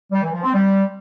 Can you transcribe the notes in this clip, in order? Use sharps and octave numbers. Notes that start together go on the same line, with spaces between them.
G3
E3
F3
C4
G3